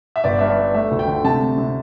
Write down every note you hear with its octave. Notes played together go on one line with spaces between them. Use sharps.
E5
G1 D5
G2 E5
D5
G2
A3 E5
D2
G5
D3
C3 A5
A3
C3